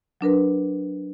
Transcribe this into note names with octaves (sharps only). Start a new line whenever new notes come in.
F#3 D4 A#4 B4